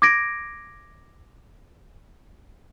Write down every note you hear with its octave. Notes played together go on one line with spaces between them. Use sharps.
D6 G#6 A#6 D7